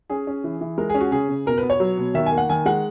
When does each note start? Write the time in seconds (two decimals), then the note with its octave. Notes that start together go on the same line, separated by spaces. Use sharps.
0.10 C#4 G#4
0.27 C#4
0.44 E3
0.61 E3
0.78 G#3 A#4
0.90 C#4 G#4
1.01 F#4
1.12 C#3 G#4
1.29 C#3
1.46 B2 A#4
1.58 B4
1.63 B3
1.70 C#5
1.80 F#3
1.98 B2
2.14 D#3 E5
2.26 G#5
2.32 A#3
2.38 F#5
2.49 D#3 G#5
2.65 G#3 F#5